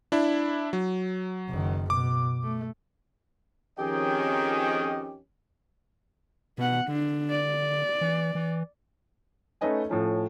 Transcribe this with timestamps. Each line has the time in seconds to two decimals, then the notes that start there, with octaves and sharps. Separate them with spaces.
0.12 D4 E4
0.73 F#3
1.49 F#1 D#3
1.90 B2 D6
2.43 A3
3.79 F2 D#3 C#4 G4 G#4 D#5 G5
6.58 B2 B3 F#5
6.88 D3 D4
7.31 D5
8.01 E3
8.35 E3
9.61 A3 C#4 D#4 B4 D#5 G#5
9.89 A2 F3 C#4